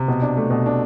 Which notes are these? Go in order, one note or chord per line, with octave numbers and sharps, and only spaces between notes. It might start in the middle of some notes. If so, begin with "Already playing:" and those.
Already playing: C3
B2
D4
A3
B2
D4